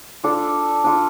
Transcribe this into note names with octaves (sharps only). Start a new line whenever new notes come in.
D4 F4 A4
D4 F4 A4